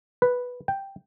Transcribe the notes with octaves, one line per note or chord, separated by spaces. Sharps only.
B4
G5